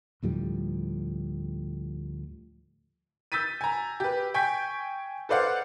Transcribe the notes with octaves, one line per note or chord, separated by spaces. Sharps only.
D2 A2 F3 G3
E6 G6 A6 B6 D#7
G#5 A#5
G4 B4
G5 G#5 C#6 G6 B6
A4 B4 C5 D5 F5 F#5